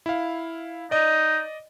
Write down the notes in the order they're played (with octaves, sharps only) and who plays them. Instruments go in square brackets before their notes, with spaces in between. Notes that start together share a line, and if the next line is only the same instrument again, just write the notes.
[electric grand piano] E4 F5
[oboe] D#4 [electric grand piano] D5 D#5